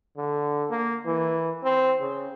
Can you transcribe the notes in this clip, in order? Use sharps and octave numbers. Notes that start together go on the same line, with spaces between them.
D3
A#3
E3
C4
C#3